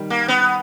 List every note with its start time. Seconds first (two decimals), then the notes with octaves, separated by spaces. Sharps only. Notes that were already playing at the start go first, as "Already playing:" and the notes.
Already playing: D#3 G3
0.10 A#3
0.28 B3